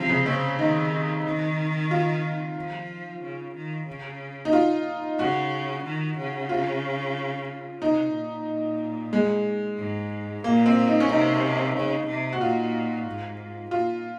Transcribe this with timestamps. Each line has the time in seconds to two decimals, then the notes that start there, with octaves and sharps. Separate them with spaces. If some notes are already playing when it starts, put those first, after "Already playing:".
Already playing: C3 F3
0.09 C#3
0.26 C#3 C4
0.59 D#3 D#4
1.25 D#3
1.91 F4
2.56 F3
3.22 C#3
3.55 D#3
3.87 C#3
4.45 D#4
4.53 F4
5.19 C#3 F#4
5.84 D#3
6.17 C#3
6.49 F4
7.81 C3 D#4
8.14 A#2
9.13 G#3
9.78 G#2
10.44 A#2 A#3
10.66 C4
10.88 D#4
11.00 C#4
11.09 C3 D#4
11.75 C#3
12.07 C3
12.33 F#4
12.40 A#2 F4
13.07 G#2
13.71 A#2 F4